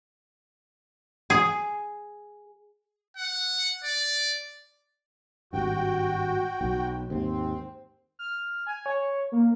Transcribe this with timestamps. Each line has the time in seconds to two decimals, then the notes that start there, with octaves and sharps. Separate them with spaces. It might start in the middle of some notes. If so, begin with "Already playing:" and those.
1.30 G#4
3.17 F#5
3.84 D5
5.53 G#1 G2 F#4 G5
6.61 B1
7.10 D#2 G#2 C4
8.19 F6
8.67 G#5
8.86 C#5
9.32 A#3